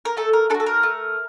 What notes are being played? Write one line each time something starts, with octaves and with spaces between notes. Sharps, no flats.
A#4
A3 A4
A#4
D4 F#4 A4
A4
A#4
A3